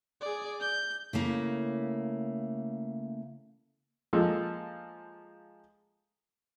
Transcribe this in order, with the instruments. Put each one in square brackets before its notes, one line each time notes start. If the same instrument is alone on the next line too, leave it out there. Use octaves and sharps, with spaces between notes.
[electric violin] G#4 D5
G6
[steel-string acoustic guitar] C#3 A3 A#3 E4
[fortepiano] F3 G#3 A#3 A4